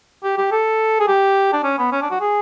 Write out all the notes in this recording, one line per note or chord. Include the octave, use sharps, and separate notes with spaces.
G4
G4
A4
G#4
G4
D4
C#4
B3
C#4
D4
F#4
G#4